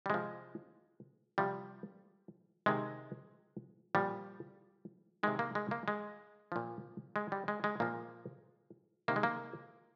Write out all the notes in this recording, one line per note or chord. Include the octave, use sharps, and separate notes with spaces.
G3
C3 F3 G#3
C3 F3 G3
C3 D#3 G#3
A#2 F3 G3
C3 D#3 G#3
A#3
G#3
A#3
G#3
A#2 F3
G#3
G3
G#3
G#3
A#2 F3 A#3
C3 D#3 A#3
G#3
A#3